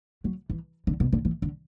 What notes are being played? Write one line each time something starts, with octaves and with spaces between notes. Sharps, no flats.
F#3
E3
D3
B2
D3
E3
D3